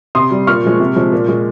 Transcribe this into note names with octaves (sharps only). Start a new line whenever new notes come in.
C3 C6 D#6
G3
A#2 C#6 F6
F3 G#3
C3
F3 G#3
A#2
G#3